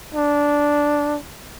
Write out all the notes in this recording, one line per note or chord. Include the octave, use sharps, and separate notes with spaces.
D4